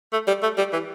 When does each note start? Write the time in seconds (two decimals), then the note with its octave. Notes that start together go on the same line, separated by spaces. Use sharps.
0.13 A3
0.27 G3
0.43 A3
0.58 G3
0.73 E3